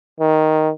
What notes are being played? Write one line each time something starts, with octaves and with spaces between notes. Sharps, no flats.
D#3